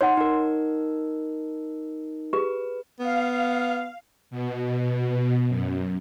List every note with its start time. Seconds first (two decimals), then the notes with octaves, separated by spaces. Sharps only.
0.01 D#4 C#5 F#5 C6
0.17 D#4 A#4
2.33 G4 G#4 B4
3.00 B3 F5
4.31 B2
5.48 F#2